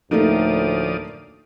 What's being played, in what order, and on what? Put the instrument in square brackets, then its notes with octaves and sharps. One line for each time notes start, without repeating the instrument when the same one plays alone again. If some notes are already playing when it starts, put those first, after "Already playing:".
[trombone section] D2 A2 [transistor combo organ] F3 D5 D#6 [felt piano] A3 A#3 D#4